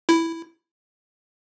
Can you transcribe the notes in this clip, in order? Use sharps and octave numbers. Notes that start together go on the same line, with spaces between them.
E4